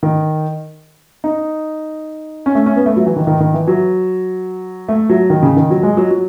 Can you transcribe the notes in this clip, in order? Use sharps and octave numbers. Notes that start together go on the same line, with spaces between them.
D#3
D#4
C#4
A3
C#4
B3
A3
F#3
E3
D#3
D#3
D#3
E3
F#3
A3
F#3
D#3
C#3
D#3
F#3
G#3
F#3
F#3